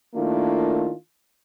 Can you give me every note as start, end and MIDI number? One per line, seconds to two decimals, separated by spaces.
0.15 0.92 51
0.15 0.92 57
0.15 0.92 58
0.15 0.92 62
0.15 0.92 64
0.15 0.92 65